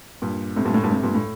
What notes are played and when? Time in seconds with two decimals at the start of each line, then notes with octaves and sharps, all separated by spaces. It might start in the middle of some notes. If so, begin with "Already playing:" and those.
0.22 G2 A#2
0.56 A2 C3
0.65 G2 A#2
0.74 A2
0.83 G2 A#2
0.91 A2 C3
1.03 G2 A#2
1.15 A2